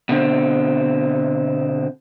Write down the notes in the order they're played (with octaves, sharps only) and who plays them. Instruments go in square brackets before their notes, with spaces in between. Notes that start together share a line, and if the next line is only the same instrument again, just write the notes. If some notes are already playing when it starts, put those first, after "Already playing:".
[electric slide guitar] B2 D3 C4